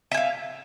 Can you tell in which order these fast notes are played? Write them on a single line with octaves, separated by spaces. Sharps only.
E5 G#5 F5